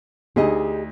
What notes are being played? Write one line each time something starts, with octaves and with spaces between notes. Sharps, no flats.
D2 D#4 G4 G#4 D#5